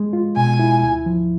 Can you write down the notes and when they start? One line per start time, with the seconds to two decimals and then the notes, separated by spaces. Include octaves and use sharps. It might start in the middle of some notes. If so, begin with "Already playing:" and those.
Already playing: G#3
0.13 F4
0.36 B2 G#5
0.60 E4
0.83 D2
1.06 F3